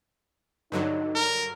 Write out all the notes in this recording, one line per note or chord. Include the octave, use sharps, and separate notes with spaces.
G2 D3 F#3 D#4
A#4